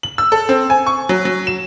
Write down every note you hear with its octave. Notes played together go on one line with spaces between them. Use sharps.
F#7
E6
A4
C4
G#5
C#6
F#3
F#3
E7